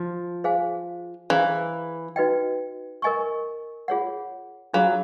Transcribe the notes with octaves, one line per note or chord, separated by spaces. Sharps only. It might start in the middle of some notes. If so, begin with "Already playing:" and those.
Already playing: F3
G#4 C5 F5 G#5
E3 G#4 C5 F5 A#5
D#4 F#4 B4 D#5 G5
A#4 D#5 G#5 C#6
F4 G#4 C#5 F#5
F#3 D4 F4 G#4 C#5 F5